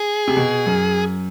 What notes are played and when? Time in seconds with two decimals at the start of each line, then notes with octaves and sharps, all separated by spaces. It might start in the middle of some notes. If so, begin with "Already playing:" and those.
Already playing: G#4
0.28 C3
0.37 B2
0.66 F#2